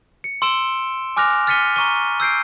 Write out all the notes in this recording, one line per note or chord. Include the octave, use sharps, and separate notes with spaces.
C#7
C6 E6 D7 E7 G7
G#5 D6 F6 F#6 A#6 F7
F6 A6 B6 C#7 D#7 G7
A#5 C#6 D#7 G7
E6 G6 C7 D7